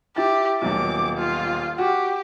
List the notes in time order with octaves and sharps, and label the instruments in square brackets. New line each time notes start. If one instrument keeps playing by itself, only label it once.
[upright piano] E4 A6 [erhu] G4
[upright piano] D#1 B1 [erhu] D6
[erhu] F4
[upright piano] F#4 [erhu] G4